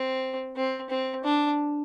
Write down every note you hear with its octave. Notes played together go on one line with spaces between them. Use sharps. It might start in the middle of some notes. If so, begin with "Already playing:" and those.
Already playing: C4
C4
C4
D4